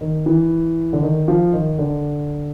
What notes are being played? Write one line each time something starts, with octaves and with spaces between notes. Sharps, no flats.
D#3
E3
D3
D#3
F3
D#3
D3